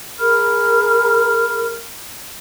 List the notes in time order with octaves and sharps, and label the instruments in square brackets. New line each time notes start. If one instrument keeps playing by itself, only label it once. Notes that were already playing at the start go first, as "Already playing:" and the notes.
[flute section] G#4 A#4 B5 F6